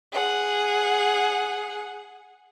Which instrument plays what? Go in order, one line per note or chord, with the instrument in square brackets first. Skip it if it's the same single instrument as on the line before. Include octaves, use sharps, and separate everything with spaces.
[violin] G#4 F#5